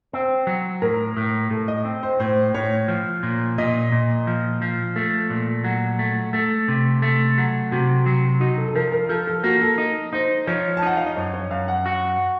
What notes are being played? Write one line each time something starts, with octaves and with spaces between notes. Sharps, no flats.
C4 C5
F#3
A2 A#4
A2
A2 A4
D#5
C4
C5
A2 C5
A2 C#5
F3
A#2
A#2 D#5
A#2
F3
F3
A3 A4
A#2
F#3
A3
A3 A4
C3
A3
F#3
C3 F#4
F#3
D#4 F#4
A4
A4
F3 A#4
A#4
F3 A4
A4
A#3 F#4
A4
D#4
D#4 C5
F3 C#5
A5
D#4 F#5
F5
D#5
F#2 C#5
C#5
F#2 F5
F#5
F#4